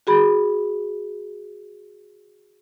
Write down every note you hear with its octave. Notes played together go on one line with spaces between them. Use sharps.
F#4 G#4 B5